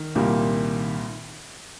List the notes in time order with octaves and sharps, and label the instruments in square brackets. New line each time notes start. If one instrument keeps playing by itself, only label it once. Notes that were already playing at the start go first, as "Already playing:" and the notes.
Already playing: [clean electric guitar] D#3
[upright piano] C2 A#2 G3 A#3